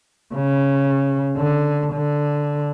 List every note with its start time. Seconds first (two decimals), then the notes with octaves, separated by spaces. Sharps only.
0.34 C#3
1.36 D3
1.93 D3